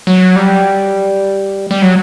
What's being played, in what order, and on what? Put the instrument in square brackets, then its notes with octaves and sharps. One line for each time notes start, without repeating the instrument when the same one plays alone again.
[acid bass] F#3
G3
G3
F#3